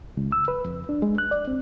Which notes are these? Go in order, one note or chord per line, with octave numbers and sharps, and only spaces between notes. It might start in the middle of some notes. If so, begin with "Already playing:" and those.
C#2
E6
B4
F2
D4
G#3
F#6
D5
C4